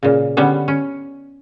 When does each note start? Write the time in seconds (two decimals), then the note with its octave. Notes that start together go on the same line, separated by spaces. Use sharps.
0.03 A#2 C#3
0.37 D3 G3 B3 C#4
0.68 C#4